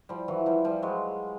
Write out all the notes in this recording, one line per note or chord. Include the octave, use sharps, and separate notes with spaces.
F3 G3
E3 F#3
F3 G3
F3 G3
F#3 G#3